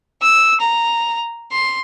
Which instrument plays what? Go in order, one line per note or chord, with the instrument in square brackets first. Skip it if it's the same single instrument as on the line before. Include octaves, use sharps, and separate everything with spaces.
[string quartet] E6
A#5
C6